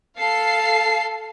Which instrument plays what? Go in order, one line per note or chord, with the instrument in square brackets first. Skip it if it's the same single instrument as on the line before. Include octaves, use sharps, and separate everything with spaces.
[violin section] A4 F5 C7